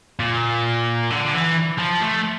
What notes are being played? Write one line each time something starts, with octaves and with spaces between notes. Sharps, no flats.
A#2
D3
E3
F3
A3